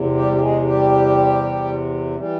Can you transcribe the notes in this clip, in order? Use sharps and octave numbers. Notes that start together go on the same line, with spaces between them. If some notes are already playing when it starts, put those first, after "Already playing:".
Already playing: E2 C3
G3 G4
G4
G#3 G#4
G3 G4
E3 G3